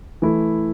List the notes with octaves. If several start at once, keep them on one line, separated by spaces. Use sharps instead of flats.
E3 A3 E4